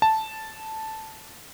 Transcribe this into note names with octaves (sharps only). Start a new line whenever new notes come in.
A5